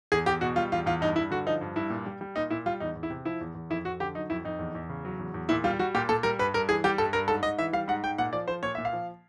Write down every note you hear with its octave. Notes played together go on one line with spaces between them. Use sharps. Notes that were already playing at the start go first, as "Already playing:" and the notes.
E2 G#4
E2 G4
B2 F#4
G3 F4
E2 F4
E2 F4
G2 D#4
G2 E4
D3 F#4
F3 D#4
G2
G2 E4
A#2
G3
G3
A#2 D#4
A#2 E4
G3 F4
E2 D#4
E2
E4
C3
F3 E4
E2
E2
F2 E4
F2 F#4
D3 G4
F#3 D#4
F2 E4
F2 D#4
E2
E2
C#3
F#3
E2
E2
A#2 E4
G3 F4
G3 F#4
A#2 G4
A#2 A4
G3 A#4
G2 B4
G2 A#4
E3 G#4
G3 G4
G2 A4
G2 A#4
G#2 A4
G#2 D#5
E3 E5
G3 F5
G#2 F#5
G#2 G5
A#2 F#5
F3 D5
F3 C5
A#2 C#5
A#2 E5
F5
F3